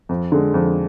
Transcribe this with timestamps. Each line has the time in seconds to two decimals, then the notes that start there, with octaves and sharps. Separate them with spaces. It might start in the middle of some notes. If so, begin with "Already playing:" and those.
0.09 F2
0.32 D3 G#3
0.54 F2